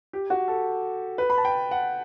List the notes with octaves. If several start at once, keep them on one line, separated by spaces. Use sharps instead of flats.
G4
F#4
A4
B4
B5
A5
G5
F#5